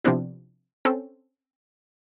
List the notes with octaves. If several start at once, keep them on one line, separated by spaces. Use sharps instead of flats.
C3 F3 B3 C4 D4 E4
C4 C#4 A4